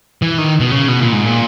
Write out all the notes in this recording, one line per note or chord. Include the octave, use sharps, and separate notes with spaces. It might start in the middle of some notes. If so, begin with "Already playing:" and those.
E3
D#3
B2
C#3
B2
A#2
G#2
A#2